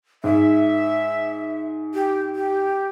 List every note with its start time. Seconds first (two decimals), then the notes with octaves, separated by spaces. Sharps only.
0.24 G#2 E5
1.94 G4
2.36 G4